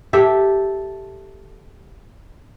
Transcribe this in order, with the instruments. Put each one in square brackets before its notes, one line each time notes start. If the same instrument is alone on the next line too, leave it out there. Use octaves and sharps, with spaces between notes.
[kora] G4 A4 E5